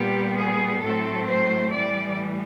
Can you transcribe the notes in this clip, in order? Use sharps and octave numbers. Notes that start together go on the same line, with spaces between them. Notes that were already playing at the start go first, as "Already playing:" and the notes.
Already playing: A#2 G3 B3 G4
G#4
A2 F#3 A3 C4 A4
C5
A2 E3 G3 D5